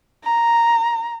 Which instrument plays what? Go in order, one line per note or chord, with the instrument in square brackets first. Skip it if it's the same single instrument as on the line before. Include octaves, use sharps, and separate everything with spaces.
[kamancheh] A#5